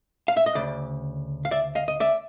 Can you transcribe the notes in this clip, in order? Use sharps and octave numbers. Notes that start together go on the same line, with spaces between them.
F5
E5
D#5
D2 C#3 D5
F5
D5 E5
D#5 F5
D#5
D5 E5